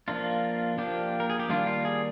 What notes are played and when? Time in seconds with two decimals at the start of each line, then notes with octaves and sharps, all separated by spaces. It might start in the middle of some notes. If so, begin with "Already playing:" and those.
0.08 F3 A#3 D4 F4
0.78 F3 A#3 D4 G4
1.20 A#4
1.30 G#4
1.39 G4
1.49 D#3 G3 A#3 D4 F4
1.67 F4
1.85 G#4